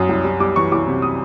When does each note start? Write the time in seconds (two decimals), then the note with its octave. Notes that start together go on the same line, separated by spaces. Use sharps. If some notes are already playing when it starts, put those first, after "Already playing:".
Already playing: F#2 D#6
0.09 C2
0.24 G3
0.40 G3 D6
0.56 E3 C#6
0.72 C2 D6
0.87 C3
1.02 D#6